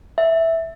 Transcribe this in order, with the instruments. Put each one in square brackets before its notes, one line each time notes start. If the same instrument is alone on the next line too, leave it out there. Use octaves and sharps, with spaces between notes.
[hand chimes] E5